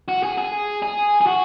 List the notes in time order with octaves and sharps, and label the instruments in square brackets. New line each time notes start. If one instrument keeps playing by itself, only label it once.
[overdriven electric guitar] F#4
G#4
G#4
G#4
G#4
F#4